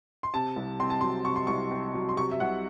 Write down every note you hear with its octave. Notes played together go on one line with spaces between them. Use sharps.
C6
C3 A5
C2
C4 C6
A5
F#3 C6
C3 C#6
C6
C2 C#6
C4
F#3
C6
C3 C#6
E5
C2 F#5